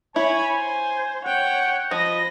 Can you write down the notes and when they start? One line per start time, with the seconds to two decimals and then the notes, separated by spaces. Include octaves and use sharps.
0.16 E4 C#5 G#5 B5
0.55 C5
1.25 C#5 F#5 G5
1.91 F3 D#5 B5 A#6